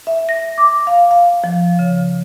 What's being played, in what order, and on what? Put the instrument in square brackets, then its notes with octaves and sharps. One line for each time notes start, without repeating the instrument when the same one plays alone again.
[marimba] E5
A#6
D6
F5
F5
F3
C#3